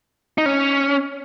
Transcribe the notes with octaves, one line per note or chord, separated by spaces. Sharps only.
D#4
C#4